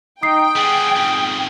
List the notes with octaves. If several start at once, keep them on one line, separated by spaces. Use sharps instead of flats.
D#4 G5 D#6 C7
G3 B3 G#4
F2 G#2